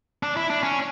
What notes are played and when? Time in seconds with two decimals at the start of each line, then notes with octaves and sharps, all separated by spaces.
0.23 D4
0.37 E4
0.50 D4
0.63 C#4